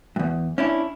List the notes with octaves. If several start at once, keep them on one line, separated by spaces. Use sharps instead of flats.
E2 G2
C#4 D4 E4